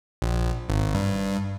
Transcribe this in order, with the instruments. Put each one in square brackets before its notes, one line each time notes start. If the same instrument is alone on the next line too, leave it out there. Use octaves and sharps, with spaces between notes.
[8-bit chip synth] A#1
G#1
G2